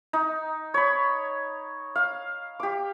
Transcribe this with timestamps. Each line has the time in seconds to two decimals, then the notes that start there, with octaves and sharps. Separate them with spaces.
0.13 D#4
0.74 C#5 B5
1.95 F5
2.60 G4 D6